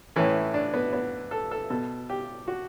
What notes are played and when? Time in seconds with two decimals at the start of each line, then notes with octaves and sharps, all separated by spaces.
0.16 A2 E3 C#4
0.54 D4
0.74 B3
0.93 B3
1.31 A4
1.51 A4
1.70 B2 A4
2.10 G4
2.48 F#4